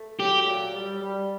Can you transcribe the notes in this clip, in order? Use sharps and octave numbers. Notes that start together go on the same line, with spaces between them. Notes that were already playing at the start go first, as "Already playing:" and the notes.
Already playing: A3
F#3 G4
A#2
G3
G3